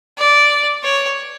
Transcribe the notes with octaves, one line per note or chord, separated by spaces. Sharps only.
D5
C#5